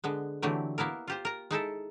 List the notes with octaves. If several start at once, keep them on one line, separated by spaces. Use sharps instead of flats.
D3 G#3 B3
D3 E3 F#3 A3 C4 G4
A#3 B3 E4 A#4
F4 G4 C5
A#4 A#5
G#3 D#4 E4 A4